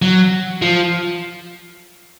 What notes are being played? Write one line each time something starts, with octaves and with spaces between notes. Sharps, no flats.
F#3
F3